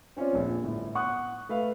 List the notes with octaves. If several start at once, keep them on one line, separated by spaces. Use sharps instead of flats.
C4 C#4 F4 C#5 D5
A#1 F2
G1 A2
F#5 C#6 D#6 F#6
A3 B4 F5